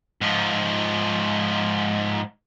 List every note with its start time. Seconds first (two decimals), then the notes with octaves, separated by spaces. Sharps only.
0.21 G#2 F3